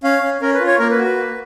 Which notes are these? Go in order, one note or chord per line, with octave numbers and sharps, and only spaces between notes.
C#4 F5
C#4
C#4 A#4
B4
F4
C#5
A#3 A#4
B4
F#4
B4
A#3